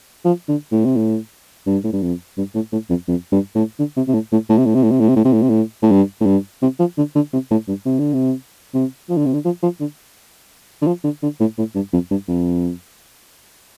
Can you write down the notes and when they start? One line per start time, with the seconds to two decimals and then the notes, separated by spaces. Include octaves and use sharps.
0.25 F3
0.49 D3
0.72 A2
0.85 C3
0.96 A2
1.67 G2
1.84 A2
1.93 G2
2.02 F2
2.38 G2
2.55 A2
2.72 A2
2.90 F2
3.08 F2
3.32 G2
3.55 A2
3.79 D3
3.96 C3
4.08 C3
4.14 A2
4.32 A2
4.50 A2
4.58 C3
4.66 A2
4.75 C3
4.83 A2
4.91 C3
5.00 A2
5.08 C3
5.16 A2
5.25 C3
5.33 A2
5.42 C3
5.49 A2
5.82 A2
5.91 G2
6.21 A2
6.26 G2
6.62 C3
6.79 F3
6.98 D3
7.15 D3
7.33 C3
7.51 A2
7.68 G2
7.86 C3
7.99 D3
8.14 C3
8.74 C3
9.09 F3
9.17 D3
9.26 C3
9.34 D3
9.45 F3
9.63 F3
9.80 D3
10.82 D3
10.87 F3
11.04 D3
11.23 D3
11.40 A2
11.58 A2
11.75 G2
11.93 F2
12.11 G2
12.28 F2